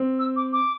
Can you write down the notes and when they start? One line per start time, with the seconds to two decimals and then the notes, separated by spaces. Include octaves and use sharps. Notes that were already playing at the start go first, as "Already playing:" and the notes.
Already playing: C4
0.19 E6
0.36 D6
0.53 D6